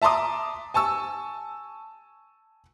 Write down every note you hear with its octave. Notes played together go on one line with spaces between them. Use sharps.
E5 A5 A#5 C6 D6 D#6
G#5 A5 C#6 E6